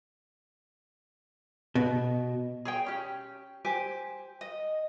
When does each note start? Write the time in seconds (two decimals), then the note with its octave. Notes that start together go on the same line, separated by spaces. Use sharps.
1.75 B2
2.65 G#4 C#5 G5
2.86 C#4 G4
3.65 G4 C5 G#5
4.41 D#5